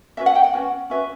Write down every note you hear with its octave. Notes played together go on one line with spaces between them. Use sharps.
C#4 F#4 B4 E5
F#5
G5
F#5
C#4 F#4 B4
C#4 F#4 B4 E5